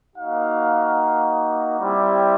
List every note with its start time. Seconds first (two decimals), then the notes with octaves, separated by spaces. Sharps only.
0.16 A#3 D#4 F#4 F5
1.80 G3 C4 E4 G4